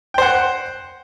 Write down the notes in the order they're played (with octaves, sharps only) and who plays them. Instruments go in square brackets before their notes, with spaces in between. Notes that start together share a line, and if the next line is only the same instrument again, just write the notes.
[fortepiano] G5
C5
F#5